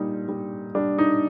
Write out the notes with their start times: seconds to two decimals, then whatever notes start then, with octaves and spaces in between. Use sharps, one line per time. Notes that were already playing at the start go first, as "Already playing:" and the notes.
Already playing: A#2 G3 D#4
0.29 G3
0.75 G3 D4
0.98 D#4